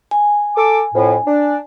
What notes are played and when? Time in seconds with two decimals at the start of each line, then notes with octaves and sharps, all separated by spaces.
0.11 G#5
0.56 A4 D6
0.94 F2 A2
1.26 D4